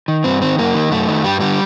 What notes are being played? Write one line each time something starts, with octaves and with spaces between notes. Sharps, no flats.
D#3
G2 C4
D#3 C4
F#2 A#3
D#3
F#2 A3
D#3
G2 G3
D3 G3